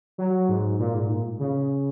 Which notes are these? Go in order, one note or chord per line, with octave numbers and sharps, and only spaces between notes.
F#3
G#2
A#2
G#2
A#2
C#3